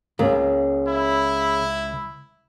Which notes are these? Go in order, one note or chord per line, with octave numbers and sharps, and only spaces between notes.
C#2 C#3 A#3
E4